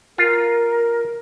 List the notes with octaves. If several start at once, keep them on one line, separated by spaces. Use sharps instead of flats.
F4 A#4